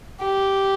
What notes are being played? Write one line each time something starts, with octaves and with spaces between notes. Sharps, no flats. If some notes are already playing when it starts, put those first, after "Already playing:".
G4